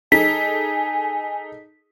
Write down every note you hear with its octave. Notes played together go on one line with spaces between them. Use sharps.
D#4 G#4 A4 G#5 B6